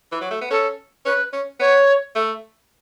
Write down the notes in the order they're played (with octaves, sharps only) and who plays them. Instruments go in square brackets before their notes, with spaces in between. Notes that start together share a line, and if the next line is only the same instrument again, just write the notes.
[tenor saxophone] E3
F#3
A3
B3
[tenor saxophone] C#4 [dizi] A4
[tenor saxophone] C#4 [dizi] B4
[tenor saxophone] C#4
[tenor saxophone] B3 [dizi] C#5
[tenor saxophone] A3